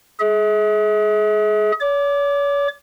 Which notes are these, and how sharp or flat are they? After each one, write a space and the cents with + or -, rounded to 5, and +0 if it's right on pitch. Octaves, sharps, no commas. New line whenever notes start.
G#4 +30 E5 -45
C#5 +40 D6 +0